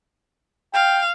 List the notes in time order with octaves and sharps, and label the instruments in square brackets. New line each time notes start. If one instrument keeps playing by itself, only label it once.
[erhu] F5 [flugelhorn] G5